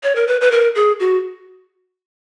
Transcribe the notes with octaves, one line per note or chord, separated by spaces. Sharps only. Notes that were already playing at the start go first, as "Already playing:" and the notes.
C#5
A#4
B4
B4
A#4
G#4
F#4